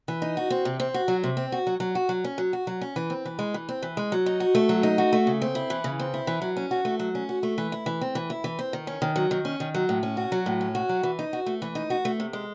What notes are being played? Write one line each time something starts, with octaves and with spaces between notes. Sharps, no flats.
E3
D#4
F#4
C4
C3
C4
F#4
F#3
C3
C4
F#4
F#3
F#3
F#4
F#3
C#4
F#3
F#4
F#3
C#4
E3
C4
E3
G#3
E3
C4
E3
G#3
F#3
D#4
F#4
A3
F#3
D#4
F#4
A3
C#3
C4
E4
E3
C#3
C4
E4
E3
F#3
C#4
F#4
A3
F#3
C#4
F#4
A3
E3
E4
E3
C4
E3
E4
E3
C4
D#3
C#4
D#3
F#3
D#3
C#4
D#3
F#3
A2
C#4
F#4
F#3
A2
C#4
F#4
F#3
E3
D#4
F#4
A3
E3
D#4
F#4
A3
C3
G#3